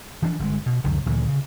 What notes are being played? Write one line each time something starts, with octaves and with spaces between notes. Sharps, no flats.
E3 F3 C4 D4
G1 G#3
B2
C#2 F#2 D3 D#3
D2 A#2 E3 F#3
C#3